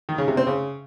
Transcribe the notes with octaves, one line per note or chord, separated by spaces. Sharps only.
D#3
C#3
C3
C4
C#3